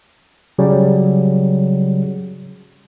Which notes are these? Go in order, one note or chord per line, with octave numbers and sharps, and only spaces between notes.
C#3 F#3 G3